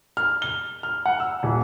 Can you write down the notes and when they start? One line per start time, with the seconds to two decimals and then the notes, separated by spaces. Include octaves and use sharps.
0.17 F6
0.42 G7
0.83 F6
1.06 F#5
1.20 E6
1.43 D#1